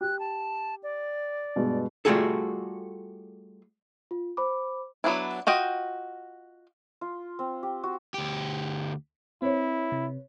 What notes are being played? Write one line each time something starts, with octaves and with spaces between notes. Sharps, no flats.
G4 F#6
A5
D5
G2 B2 G#3
G3 A3 F4 F#4 G#4 A4
F4
C5 B5 D6
F#3 B3 D4 E4
F4 F#4 D#5 G5
F4
C4
G4
F#4
D2 G4
C4 E4 B4 C#5
C3